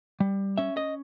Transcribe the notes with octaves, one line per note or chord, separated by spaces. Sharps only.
G3
C#4 E5
D#5